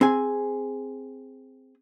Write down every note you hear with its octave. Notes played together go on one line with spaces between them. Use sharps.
C4 G#4 G#5